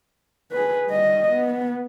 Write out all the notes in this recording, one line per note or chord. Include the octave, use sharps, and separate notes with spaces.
G#4 B4
G3 D#5
B3